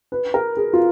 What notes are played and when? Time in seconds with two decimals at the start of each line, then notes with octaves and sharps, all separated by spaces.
0.12 B4
0.34 A#4
0.57 G#4
0.73 F4